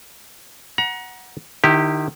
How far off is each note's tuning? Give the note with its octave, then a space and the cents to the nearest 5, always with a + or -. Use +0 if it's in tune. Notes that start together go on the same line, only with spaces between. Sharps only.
F#5 +0 A#5 +35
D#3 -30 E4 -25 G4 +0